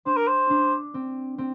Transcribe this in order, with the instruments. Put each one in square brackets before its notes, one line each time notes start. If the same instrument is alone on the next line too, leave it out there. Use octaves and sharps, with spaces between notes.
[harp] D4 [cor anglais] C5
[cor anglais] A#4
C5
[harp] D4
C4
C4